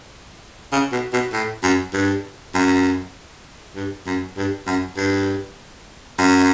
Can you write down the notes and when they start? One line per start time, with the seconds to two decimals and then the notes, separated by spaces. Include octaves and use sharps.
0.73 C#3
0.92 B2
1.13 B2
1.33 A2
1.63 F#2
1.94 G2
2.55 F#2
3.76 G2
4.07 F#2
4.37 G2
4.67 F#2
4.97 G2
6.19 F#2